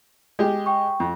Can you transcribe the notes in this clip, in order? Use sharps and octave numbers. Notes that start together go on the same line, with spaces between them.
G#3 G4
G5 C#6
F2